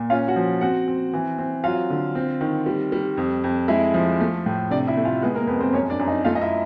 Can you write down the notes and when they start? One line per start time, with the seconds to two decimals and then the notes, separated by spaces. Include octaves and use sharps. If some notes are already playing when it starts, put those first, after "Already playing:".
Already playing: A#2
0.10 C#4 F4 F5
0.28 F#4 F#5
0.36 F3
0.61 C4 F#4 F#5
0.88 C4
1.13 E3
1.38 C4
1.63 F#3 F4 F5
1.90 D3
2.15 C4
2.41 D#3
2.66 G3
2.92 G3
3.17 F2
3.44 F2
3.68 G#3 E4 E5
3.94 F3
4.20 A3
4.46 A2
4.71 C3 D4 D5
4.87 E4 E5
4.97 A3
5.05 F4 F5
5.22 G#3 B3 B4
5.35 A#3 A#4
5.47 F2 B3 B4
5.60 C4 C5
5.73 F#2 C#4 C#5
5.90 D4 D5
5.99 F#2
6.07 D#4 D#5
6.25 A3 F4 F5
6.35 D#5
6.42 E4 E5